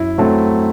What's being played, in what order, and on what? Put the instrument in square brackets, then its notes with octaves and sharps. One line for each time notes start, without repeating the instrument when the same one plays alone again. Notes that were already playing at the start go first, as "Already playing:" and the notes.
Already playing: [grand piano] F#2 E4
F#3 A3 C4